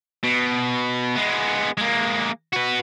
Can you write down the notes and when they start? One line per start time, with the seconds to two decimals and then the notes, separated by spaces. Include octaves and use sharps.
0.23 B2
1.16 G#3 B3
1.78 G#3 A#3
2.53 F#4 B4